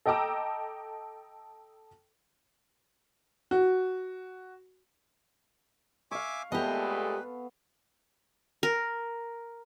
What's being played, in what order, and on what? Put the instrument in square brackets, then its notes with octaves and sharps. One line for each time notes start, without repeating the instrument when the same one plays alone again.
[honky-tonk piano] A4 D#5 G5 A#5 D6 E6
[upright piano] F#4
[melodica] E5 G#5 D6 [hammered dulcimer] F5 C#6
[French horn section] A#2 G#3 A3 [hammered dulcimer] B3 A4 [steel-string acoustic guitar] G4 D#5 [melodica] B4
[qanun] A#4